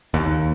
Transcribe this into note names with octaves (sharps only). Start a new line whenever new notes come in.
D#2